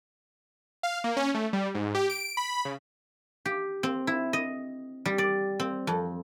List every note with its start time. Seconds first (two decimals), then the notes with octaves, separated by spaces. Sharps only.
0.83 F5
1.04 A#3
1.17 C#4
1.34 A3
1.53 G3
1.74 G#2
1.95 G4
2.10 D7
2.37 B5
2.65 C#3
3.46 G4
3.83 C4
4.07 E4
4.33 D#5
5.05 G3
5.18 D5
5.60 C4
5.87 F2